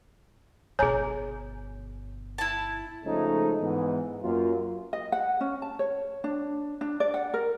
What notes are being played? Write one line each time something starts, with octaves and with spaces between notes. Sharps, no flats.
G1 B2 G#4 C#5 G#5 A#5
E4 A5
C#3 F3 G#3 A3 C#4 D#4
G#2 E3 B3
F#2 A#3 F4
D#5
F#5
C#4
A5
C#5
D4
D4
D5
F#5
A#4